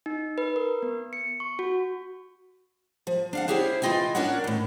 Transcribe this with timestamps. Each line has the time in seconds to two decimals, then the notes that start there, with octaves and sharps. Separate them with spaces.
0.06 D#4
0.38 B4
0.56 A#4
0.83 B3
1.13 C#7
1.40 C#6
1.59 F#4
3.07 F3
3.33 D4 F5 F#5
3.48 C#4 E4 G4 G#4 C5
3.82 E3 A3 F4 D#5 G5 G#5
4.15 C#4 D4 A#4 C#5 D5 F#5
4.44 A2 D#3